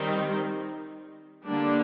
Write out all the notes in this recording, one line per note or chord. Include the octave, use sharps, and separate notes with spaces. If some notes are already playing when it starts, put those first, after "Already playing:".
Already playing: D#3 G3 C4 D#4
D3 G3 A#3 D4